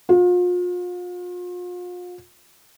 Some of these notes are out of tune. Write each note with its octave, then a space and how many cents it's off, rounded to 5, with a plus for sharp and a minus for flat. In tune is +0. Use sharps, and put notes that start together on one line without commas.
F4 +40